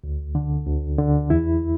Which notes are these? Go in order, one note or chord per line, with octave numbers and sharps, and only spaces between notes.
D2
D3
D2
D3
E2 E4